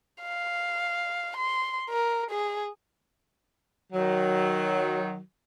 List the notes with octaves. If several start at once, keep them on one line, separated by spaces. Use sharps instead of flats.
F5
C6
A#4
G#4
D#3 F#3